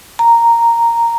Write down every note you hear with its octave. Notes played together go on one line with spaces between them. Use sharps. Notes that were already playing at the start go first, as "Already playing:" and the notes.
A#5